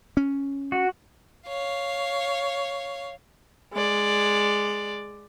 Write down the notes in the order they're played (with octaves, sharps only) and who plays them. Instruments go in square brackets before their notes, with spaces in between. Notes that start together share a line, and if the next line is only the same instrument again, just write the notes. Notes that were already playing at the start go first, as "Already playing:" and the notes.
[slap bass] C#4
[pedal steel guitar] F#4
[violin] C#5 F5
[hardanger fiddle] G#3 D5